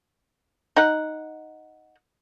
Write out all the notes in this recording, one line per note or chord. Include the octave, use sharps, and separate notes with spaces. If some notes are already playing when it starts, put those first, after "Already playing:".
D#4 F#5